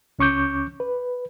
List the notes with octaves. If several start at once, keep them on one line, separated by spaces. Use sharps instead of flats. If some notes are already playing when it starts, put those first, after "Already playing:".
C#2 C#4 C#6 D6 G6
B4